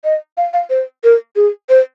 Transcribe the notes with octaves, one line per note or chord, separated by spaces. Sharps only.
D#5
F5
F5
C5
A#4
G#4
C5